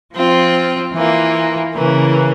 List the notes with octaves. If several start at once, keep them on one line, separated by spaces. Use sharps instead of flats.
F3 C4 F4
E3 A#3 F4
C#3 E3 A#3